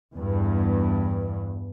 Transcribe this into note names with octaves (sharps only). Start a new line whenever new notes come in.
E2 G2